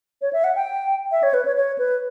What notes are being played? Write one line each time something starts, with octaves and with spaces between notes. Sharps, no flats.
C#5
E5
F#5
G5
E5
C#5
B4
C#5
C#5
B4